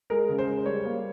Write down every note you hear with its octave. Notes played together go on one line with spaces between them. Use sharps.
G#3 A#4
C#3
C5
G#3
G3 C#5
A#3